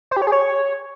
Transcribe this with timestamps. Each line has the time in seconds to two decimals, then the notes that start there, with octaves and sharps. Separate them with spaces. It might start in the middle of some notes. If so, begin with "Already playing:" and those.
0.11 C5
0.16 G4
0.22 C#5
0.27 G#4
0.32 C#5